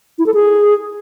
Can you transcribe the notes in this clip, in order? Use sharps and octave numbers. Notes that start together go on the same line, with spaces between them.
E4
A4
G#4